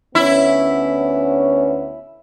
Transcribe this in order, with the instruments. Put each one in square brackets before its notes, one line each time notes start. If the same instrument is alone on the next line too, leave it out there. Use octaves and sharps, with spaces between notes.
[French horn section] D2 B3 C#4 [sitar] E4